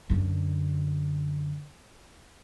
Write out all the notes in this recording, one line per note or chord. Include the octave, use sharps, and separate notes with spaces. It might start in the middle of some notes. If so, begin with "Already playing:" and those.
F#2 D3